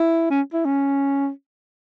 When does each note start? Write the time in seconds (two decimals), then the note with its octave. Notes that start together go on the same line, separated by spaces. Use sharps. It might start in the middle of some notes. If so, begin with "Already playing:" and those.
Already playing: E4
0.30 C#4
0.53 E4
0.65 C#4